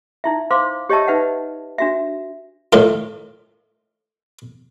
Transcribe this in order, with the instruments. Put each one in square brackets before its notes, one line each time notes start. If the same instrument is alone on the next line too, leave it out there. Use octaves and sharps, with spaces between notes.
[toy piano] D#4 E4 E5
C5 F5 C6 D6
G4 C#5 D#5 E5 A5 E6
D#4 B4 E5 F#5
D4 F#4 E5
[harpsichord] A2 D#3 F4